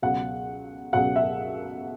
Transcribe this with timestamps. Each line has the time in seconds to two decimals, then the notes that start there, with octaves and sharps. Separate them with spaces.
0.02 C#2 B2 F#3 F#5
0.93 C#2 B2 F#3 F#5
1.16 E5